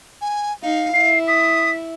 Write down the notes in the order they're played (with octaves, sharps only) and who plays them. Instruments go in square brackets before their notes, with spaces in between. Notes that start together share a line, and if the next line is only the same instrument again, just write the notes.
[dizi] G#5
[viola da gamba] D#4 [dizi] F5
[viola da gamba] E4 [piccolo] C7
[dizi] D#6 [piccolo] B6